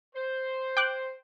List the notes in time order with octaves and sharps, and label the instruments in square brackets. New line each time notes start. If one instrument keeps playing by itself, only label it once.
[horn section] C5
[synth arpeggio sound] G5 D6 F#6